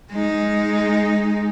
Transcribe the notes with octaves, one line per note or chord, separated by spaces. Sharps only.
G#3 D#4